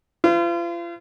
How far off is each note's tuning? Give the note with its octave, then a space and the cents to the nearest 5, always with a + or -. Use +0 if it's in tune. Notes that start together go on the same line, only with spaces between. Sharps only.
F4 -35 C5 -45